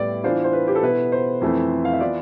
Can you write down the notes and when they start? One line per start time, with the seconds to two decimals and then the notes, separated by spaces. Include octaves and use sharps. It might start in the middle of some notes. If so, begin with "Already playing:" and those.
Already playing: A2 G3 B3 E4 D5
0.24 E3 B3 D4 F4 C5
0.44 C5
0.53 B4
0.67 G4
0.75 A4
0.82 B2 B3 E4 B4
1.12 C5
1.41 F2 E3 A3
1.85 F5
1.93 E5
2.00 E3 B3 F4 D5